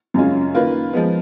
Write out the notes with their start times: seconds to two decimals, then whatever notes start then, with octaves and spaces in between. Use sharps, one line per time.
0.14 F#2 C#3 G#3 C#4 F4
0.54 D#3 A#3 F4 B4
0.93 F3 G#3 B3